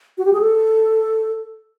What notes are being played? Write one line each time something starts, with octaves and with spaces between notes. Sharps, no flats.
F#4
G4
G#4
A4